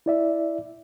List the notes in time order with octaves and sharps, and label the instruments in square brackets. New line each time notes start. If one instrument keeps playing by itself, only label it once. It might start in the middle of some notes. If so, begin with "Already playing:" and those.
[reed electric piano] E4 D5 E5